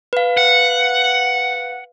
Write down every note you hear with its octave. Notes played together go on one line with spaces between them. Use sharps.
B4 F5
F#5